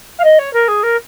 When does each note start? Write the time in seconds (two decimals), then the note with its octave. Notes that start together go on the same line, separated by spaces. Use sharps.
0.18 F5
0.24 D#5
0.39 C#5
0.53 A#4
0.68 G#4
0.83 A#4